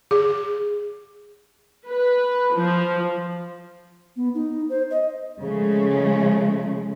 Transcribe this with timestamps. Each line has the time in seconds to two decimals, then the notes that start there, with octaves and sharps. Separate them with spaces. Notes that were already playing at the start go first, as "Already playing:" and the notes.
0.11 G#4
1.89 B4
2.55 F3
4.16 B3
4.35 D#4
4.70 C5
4.91 D#5
5.41 C#3 F3 G#3 A3